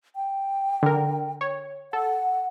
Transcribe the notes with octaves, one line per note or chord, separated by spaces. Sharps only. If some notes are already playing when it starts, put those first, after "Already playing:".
G5
D3 A#4
C#5
A4 F#5